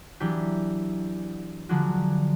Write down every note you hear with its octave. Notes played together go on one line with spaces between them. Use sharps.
E3 F#3 B3 D4 G4
D3 F3 F#3 G#3 D4 F#4